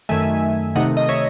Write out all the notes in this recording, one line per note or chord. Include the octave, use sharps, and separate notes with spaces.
F#2 D#3 A3 E5 G#5
C3 D#3 A3 D#4 D#5 F#5
D#5
C#5 E5